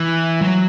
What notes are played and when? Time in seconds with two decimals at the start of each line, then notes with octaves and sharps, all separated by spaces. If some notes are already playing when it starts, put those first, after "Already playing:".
Already playing: E3
0.41 F#3